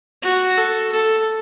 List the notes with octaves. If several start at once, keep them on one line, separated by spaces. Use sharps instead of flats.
F#4
A4
A4